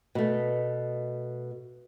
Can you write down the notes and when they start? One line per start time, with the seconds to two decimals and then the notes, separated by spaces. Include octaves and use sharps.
0.15 B2 A3